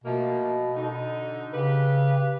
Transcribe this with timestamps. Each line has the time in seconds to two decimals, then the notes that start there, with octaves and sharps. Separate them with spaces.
0.04 B2 F3 A3 A#3
0.76 D3 D#4
1.53 C#3 G4 B4